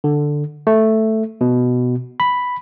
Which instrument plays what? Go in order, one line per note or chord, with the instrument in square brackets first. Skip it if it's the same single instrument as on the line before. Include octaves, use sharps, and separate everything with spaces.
[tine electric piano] D3
A3
B2
B5